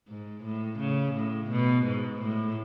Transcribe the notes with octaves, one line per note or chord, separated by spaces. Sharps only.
G#2
A2
C#3
A2
B2
G#2
A2